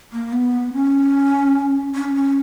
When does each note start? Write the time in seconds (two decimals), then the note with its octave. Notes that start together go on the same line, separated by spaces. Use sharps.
0.13 A#3
0.32 B3
0.74 C#4
1.95 C#4
2.15 C#4